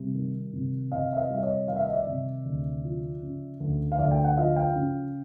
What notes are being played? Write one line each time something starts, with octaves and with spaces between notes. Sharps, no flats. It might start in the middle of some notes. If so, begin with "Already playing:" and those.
Already playing: C3 G3
D#3
C3
C3 D#5 F5
E5
D#5 F5
G3 E5
C#5 D#5
D#3 F5
E5
D#5
D5 E5
C3
D2
F3
C#3
D2
F5
D2 D5 E5
G5
F#5
F3 D#5 F5
F5 G5
C#3